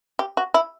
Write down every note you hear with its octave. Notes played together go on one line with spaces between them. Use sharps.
G4
F#4
E4